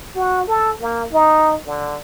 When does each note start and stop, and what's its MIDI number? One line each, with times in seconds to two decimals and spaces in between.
0.15 0.46 66
0.48 0.75 69
0.81 1.06 58
1.12 1.55 63
1.67 1.97 50